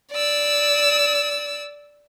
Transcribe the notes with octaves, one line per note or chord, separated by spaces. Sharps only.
D5 E6